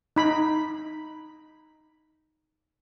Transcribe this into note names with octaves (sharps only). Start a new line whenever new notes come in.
D#4 B5